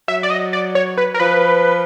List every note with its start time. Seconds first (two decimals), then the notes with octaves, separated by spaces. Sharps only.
0.08 F#3 E5
0.23 D5
0.30 D#5
0.53 D5
0.75 C#5
0.98 B4
1.14 A#4
1.20 F3 B4